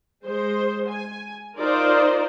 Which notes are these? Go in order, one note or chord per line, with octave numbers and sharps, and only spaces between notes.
G#3 C5
G#5
D#4 F4 A#4 C5 D5